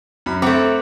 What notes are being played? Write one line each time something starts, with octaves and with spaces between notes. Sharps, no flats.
F#2 B5
A3 C4 F#5 A#5 D6